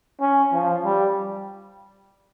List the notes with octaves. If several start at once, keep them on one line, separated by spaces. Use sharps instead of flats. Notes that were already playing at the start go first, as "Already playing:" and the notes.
C#4
F3
G3